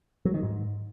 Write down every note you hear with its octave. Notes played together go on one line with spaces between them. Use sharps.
F#3
D#3
G#2